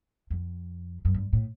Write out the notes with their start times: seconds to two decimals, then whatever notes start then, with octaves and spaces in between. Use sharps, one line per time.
0.30 F2
1.05 F#2
1.14 G2
1.33 A2